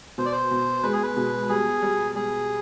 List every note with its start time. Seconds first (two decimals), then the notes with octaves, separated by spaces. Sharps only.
0.18 B2 C5
0.26 D5
0.32 C5
0.51 B2
0.83 G#3 B4
0.93 G#4
1.03 B4
1.17 B2
1.49 G3 G#4
1.82 G3
2.15 G3 G#4